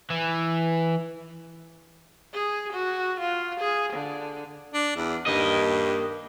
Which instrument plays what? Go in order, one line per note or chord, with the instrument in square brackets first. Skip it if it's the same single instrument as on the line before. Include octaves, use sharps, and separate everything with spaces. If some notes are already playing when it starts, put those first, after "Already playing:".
[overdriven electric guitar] E3
[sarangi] G#4
F#4
F4
G#4
D3
[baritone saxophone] D4
E2
[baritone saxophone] G2 [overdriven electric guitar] A#3 D#5